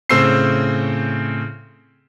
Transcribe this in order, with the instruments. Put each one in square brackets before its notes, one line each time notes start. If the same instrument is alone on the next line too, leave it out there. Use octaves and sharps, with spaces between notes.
[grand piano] A2 C#3 C4 C5 E6 C7